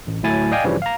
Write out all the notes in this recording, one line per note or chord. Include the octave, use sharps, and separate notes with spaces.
A1
D2 A2 F#3 E4 G#5 A6
D5 D#5 F5 G5 G#5
G2 C#3 E3 F3 G3 C#5
F5 A#5